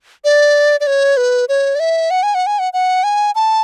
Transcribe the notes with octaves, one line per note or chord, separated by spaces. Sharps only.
D5
D5
C#5
B4
C#5
D5
E5
F#5
G#5
F#5
G#5
F#5
F#5
G#5
A5